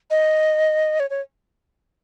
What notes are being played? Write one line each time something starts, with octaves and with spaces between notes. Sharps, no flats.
D#5
C#5
C#5